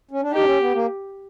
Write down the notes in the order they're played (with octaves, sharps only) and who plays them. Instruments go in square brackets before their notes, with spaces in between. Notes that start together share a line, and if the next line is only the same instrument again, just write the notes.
[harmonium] C#4
D4
[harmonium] D#4 [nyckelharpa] G4
[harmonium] D4
C#4
B3
A#3